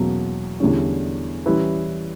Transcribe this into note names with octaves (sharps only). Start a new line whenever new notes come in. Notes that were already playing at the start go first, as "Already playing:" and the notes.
Already playing: E2 B2 F#3 A#3 C#4
E2 D3 G3 C#4 E4
E3 G3 C#4 E4 B4